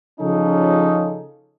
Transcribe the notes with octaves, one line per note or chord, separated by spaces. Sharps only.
C#3 F3 C#4 D#4 F4 A4